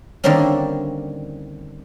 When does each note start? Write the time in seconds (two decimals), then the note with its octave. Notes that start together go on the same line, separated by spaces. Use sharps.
0.24 D3 D#3 G3 A#3 C4 C#4